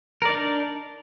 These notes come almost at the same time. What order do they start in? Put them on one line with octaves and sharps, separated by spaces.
A#4 D5 D#4 D4